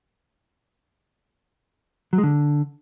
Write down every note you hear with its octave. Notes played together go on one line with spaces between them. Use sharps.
F#3
G#3
D3